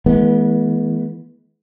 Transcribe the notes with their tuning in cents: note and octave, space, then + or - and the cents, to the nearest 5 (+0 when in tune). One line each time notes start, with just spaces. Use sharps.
E3 -20 G#3 +30 B3 -30